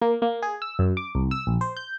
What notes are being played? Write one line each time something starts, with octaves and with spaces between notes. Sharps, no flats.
A#3
A#3
G#4
E6
F#2
D6
C2
E6
A#1
C5
G6